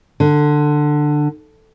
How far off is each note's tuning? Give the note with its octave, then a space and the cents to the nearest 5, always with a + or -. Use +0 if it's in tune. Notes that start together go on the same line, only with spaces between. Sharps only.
D3 +15